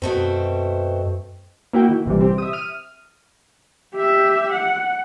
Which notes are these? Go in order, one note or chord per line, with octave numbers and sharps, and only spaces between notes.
F#2 B2 A3 C4
A#3 E4 F#4 G5
D#3
A#1 C3 E3 G3
C4 G4
E5 D#6
F6 D#7
G4 E5
F#5